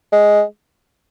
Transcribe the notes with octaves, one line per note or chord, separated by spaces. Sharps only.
G#3